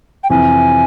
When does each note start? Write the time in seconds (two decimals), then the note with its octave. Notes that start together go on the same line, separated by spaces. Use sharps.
0.24 G5
0.30 F2 C3 E3 G#5